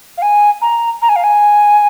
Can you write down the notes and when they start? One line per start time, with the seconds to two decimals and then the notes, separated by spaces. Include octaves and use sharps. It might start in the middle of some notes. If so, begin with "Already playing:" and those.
0.18 F5
0.22 G#5
0.62 A#5
1.02 A#5
1.09 G#5
1.16 F5
1.24 G#5